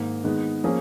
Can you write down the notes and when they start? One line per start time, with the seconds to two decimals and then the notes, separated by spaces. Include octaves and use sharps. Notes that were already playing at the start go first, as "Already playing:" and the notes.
Already playing: G#2 D#3 A#3
0.24 D#3 G#3 B3
0.64 F3 A#3 C#4 G#4